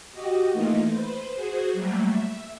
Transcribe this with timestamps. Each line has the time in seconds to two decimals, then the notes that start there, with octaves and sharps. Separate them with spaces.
0.12 F#4 G4 D#5
0.52 E3 A3 A#3 D#4 F4
0.87 B4 C5
1.32 F#4 G#4 C5
1.72 F#3 G3 A3 A#3
2.08 E5